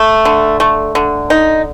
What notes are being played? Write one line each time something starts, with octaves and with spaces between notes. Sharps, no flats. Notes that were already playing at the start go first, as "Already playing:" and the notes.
Already playing: A3
D3
A3
D3
D#4